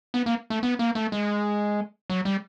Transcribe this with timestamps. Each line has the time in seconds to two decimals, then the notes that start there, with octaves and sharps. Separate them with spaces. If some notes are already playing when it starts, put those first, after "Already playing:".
0.14 B3
0.26 A#3
0.50 A3
0.63 B3
0.79 A#3
0.95 A3
1.12 G#3
2.10 F#3
2.25 G3